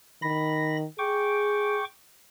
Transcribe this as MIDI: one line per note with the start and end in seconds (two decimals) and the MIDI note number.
0.22 0.86 51
0.22 0.77 83
0.22 0.77 94
0.98 1.81 68
0.98 1.84 79
0.98 1.84 85
0.98 1.84 86